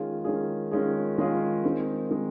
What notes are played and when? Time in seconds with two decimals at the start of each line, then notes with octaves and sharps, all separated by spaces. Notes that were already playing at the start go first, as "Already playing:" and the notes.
Already playing: D#3 G#3 C#4 F4 G#4
0.24 D#3 G#3 C#4 F4 G#4
0.71 D#3 G#3 C#4 F4 G#4
1.18 D#3 G#3 C#4 F4 G#4
1.64 D#3 G#3 C4
2.10 D#3 G#3 C4